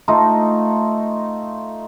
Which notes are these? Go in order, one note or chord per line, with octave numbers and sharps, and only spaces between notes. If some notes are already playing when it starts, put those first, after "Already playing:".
A3 D#4 F4